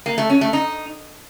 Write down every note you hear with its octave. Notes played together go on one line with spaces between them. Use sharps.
A#3
A3
C#4
A3
D#4